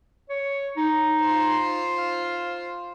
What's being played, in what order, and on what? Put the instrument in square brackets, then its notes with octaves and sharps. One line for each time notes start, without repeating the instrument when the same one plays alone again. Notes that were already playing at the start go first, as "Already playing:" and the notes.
[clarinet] C#5
D#4
[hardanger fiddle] F4 C5
[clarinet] F5